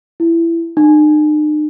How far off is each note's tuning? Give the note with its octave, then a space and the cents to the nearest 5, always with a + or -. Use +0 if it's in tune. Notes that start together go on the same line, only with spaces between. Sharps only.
E4 +20
D#4 -45